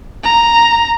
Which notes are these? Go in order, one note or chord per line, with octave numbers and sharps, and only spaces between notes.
A#5